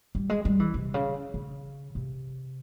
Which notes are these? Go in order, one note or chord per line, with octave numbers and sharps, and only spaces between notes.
G3
G#3
G3
E3
C3
C#3
C#3
C3